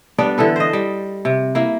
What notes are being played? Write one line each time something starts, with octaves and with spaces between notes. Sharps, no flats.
G3 B3 D4 D5
D3 E3 A4 B4
C5 D#5
G3
C3
A#3 E4